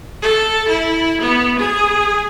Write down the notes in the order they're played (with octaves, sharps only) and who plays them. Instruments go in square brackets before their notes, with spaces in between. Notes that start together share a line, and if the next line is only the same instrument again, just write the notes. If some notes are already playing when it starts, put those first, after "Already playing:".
[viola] A4
E4
B3
G#4